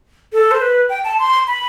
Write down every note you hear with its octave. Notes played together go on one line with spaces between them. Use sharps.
A4
C5
B4
G5
A5
C6
B5